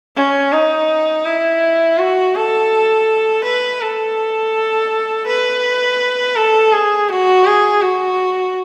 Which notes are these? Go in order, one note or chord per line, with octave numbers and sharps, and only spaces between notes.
C#4
D#4
E4
F#4
A4
B4
A4
B4
A4
G#4
F#4
G#4
F#4